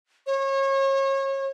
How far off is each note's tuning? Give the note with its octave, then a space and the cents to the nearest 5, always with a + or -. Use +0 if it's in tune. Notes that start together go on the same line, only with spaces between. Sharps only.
C#5 -30